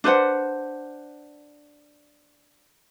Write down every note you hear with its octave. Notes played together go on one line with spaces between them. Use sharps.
D4 B4 C5 F#5